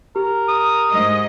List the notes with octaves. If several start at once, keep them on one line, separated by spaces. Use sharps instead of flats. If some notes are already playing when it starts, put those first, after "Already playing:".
G4 A#4
D#6
G#2 D#5